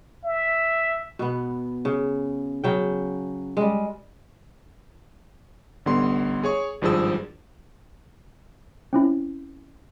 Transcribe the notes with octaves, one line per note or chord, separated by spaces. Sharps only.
E5
B2 B3
C#3
C#3 F#3 G5
G3 G#3
A1 D3 G3 B3 C6
G#4 C#5 C#6
G#1 G2 F3 G#4 E6
C4 C#4 E4